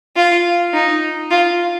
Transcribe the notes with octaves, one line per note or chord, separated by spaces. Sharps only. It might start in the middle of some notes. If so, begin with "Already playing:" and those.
F4
D#4
F4